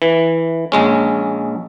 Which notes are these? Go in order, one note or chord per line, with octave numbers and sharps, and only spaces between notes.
E3
A#1 G#3 C#4